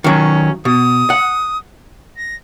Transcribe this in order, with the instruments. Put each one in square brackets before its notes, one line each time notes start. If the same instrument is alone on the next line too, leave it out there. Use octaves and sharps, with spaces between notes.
[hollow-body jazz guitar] D#3 F#3 [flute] C#4
[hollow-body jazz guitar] B2 [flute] D#6
[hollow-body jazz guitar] F#5
[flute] A#6